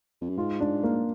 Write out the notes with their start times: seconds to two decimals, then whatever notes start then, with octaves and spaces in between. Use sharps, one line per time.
0.21 F2
0.30 F#2
0.38 G#2 F4
0.60 D4
0.83 A#3